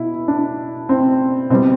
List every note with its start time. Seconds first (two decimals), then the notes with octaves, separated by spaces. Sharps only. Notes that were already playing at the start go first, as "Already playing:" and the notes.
Already playing: B2 E4
0.28 D4
0.89 C4
1.50 B2 G3 C4